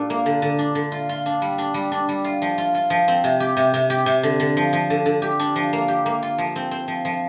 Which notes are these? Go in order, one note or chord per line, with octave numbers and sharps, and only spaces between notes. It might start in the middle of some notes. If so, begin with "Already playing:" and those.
Already playing: A#2 D4 G4
A#3
D3
D3
D4
D3
F4
F4
D4
G3
D4
G3
D4
G3
F4
F3
F4
F4
F3
C4
C3
G4
C3
C3
G4
C3
D3
D3
F3
F3
D3
D3
G4
D4
F3
A#3
G4
A#3
F4
F3
C4
C4
F3
F3